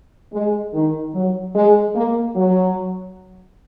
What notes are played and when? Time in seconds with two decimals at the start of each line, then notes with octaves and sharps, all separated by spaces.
0.34 G#3
0.74 D#3
1.14 F#3
1.55 G#3
1.95 A#3
2.36 F#3